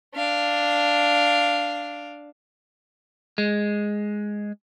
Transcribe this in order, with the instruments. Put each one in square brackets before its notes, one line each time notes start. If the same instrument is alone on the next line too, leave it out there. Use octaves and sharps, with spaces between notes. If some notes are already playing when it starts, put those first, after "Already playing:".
[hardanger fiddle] D4 F5
[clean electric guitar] G#3